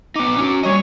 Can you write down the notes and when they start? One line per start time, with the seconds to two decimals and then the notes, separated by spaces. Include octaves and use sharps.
0.16 B3 D#4 D6
0.37 C#4 F#4
0.63 G3 C#5 D#5